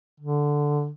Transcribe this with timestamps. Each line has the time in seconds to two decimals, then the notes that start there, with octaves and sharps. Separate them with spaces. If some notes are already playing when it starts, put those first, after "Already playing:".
0.20 D3